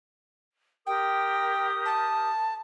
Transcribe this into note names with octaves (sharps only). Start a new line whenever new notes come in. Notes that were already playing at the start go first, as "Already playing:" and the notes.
G4 A#4 G5 D#6
A5